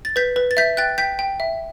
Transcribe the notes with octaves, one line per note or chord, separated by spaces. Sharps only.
A6
B4 G6 B6
B4
A6
E5 G6 B6
G5 F#6 A6
G5 G6 B6
G5
E5